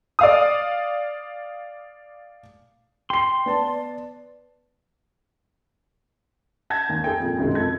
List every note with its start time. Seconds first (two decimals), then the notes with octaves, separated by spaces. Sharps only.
0.19 D5 F5 D#6
3.10 G5 C6 C7
3.46 B3 D5 A5
6.70 A5 G6 G#6 A#6
6.89 D#2
7.04 G#4 A4 G5
7.20 F2 A#2
7.38 B1 F#2 C3 D#3 G#3
7.55 F2 A4 G#6